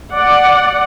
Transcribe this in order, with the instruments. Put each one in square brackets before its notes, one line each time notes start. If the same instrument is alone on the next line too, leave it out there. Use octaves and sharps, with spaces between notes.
[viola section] D5 F#5